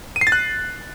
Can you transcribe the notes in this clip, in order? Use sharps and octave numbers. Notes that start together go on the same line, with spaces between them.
D#7
C7
A6
F#6